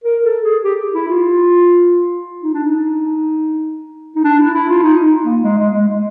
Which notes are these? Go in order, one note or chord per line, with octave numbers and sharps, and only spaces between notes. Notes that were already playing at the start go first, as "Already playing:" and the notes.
A#4
A4
G#4
G4
E4
F4
D#4
D4
D#4
D#4
D4
E4
E4
F4
D#4
D#4
A#3
G#3
G#3
G#3
G#3